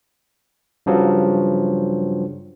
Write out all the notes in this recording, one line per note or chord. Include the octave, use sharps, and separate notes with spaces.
G2 C#3 F3 F#3